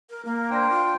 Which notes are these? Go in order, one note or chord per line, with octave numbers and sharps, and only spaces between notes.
A#4
A#3
D4 C5 G5
F4